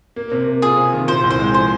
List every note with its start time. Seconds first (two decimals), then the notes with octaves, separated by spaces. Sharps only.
0.16 A#3
0.32 C3
0.46 A#3
0.62 F4 G#4
0.77 C3
0.93 D#3
1.08 A#2 C5
1.23 C2
1.30 C5
1.39 G#3
1.54 F3 C5